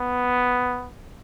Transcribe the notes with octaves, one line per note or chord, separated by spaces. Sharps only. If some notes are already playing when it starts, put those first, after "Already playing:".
Already playing: B3